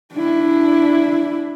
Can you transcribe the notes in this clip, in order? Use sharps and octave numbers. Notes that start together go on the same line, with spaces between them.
D4 E4